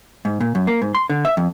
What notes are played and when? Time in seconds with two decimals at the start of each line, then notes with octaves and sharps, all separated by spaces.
0.25 G#2
0.40 A#2
0.55 F#2
0.67 A#3
0.82 G#2
0.95 C6
1.10 D3
1.25 E5
1.37 F2